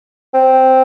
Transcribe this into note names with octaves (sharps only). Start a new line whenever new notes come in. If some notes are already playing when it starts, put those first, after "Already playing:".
C4